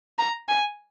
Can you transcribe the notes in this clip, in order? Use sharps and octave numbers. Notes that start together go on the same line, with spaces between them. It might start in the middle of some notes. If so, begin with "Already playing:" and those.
A#5
G#5